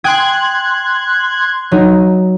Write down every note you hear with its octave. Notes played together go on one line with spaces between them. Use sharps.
G5 G#5 C6 D#6 F#6 G#6
F#3 D#4